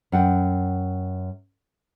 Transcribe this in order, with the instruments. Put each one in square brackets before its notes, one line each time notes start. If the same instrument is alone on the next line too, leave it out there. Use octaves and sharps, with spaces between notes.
[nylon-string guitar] F#2 F#5 G5